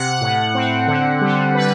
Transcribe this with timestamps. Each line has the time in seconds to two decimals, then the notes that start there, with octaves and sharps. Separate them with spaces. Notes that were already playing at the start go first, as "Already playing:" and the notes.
Already playing: C3 F#5
0.21 A2
0.55 C4
0.87 D3
1.21 G3
1.55 D3 B4